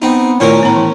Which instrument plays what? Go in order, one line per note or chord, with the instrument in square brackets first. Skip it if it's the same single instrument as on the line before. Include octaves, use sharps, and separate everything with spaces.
[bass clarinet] B3 [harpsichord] C4 D#4
[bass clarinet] A#2 [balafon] D#3 A3 E4 [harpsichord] C#4 A#4
[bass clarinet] A2 [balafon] B3 A#5
[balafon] E3